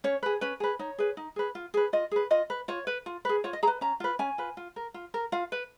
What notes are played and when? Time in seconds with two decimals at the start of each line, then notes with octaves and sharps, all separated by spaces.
0.04 C#4 C#5
0.23 G#4 B4
0.41 C#4 B4
0.60 G#4 B4
0.79 D#4 C#5
0.98 G#4 B4
1.17 D#4
1.36 G#4 B4
1.55 F4
1.74 G#4 B4
1.93 F4 D#5
2.11 G#4 B4
2.31 F4 D#5
2.50 B4
2.68 F4 C#5
2.87 B4
3.06 F4
3.25 G#4 B4
3.44 F4 C#5
3.53 D#5
3.63 G#4 A#5
3.67 B4
3.81 C#4 A#5
4.00 F4 B4
4.19 C#4 G#5
4.38 F4 B4
4.57 F4
4.76 A#4
4.94 F4
5.14 A#4
5.32 F4 F5
5.52 B4